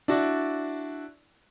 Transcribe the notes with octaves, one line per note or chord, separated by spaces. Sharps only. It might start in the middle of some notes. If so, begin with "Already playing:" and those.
D4 E4 F#4 D5